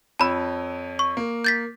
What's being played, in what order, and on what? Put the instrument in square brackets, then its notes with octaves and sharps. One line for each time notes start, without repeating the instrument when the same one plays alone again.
[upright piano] F2 C#5 E6 [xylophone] A5 B5
[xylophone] C#6
[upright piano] A#3
[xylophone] G6 A6 B6